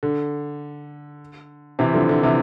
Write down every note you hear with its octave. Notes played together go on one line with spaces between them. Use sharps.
D3
C3 E3
D3 F3
D3
C3 E3